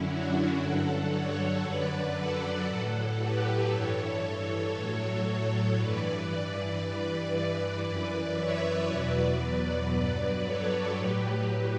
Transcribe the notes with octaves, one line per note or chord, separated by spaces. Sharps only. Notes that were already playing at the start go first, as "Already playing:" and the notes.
Already playing: F#2 D3 F#3 C#4 E4
D4 F#4
G2 D3 F#3 F#4 A4
A4 C#5
F#2 D3 F#3 B4 D5
F#4 A4
A2 F#3 F#4 A4
G4 B4
G2 E3 A4 C#5
A4 C#5
A2 F#3
G2 E3 B4 D5
G2 E3
F#2 E3 B4 D5
C#5 E5
E2 B2 F#3 B4 D5
B4 D5
G2 F#3 B4 D5
A4 C#5
A2 F#3 G4 B4
G4 B4